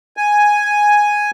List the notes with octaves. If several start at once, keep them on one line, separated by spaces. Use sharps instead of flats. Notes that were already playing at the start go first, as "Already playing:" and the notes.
G#5